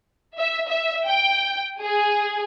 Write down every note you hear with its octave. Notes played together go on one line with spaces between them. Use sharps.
E5
E5
G5
G#4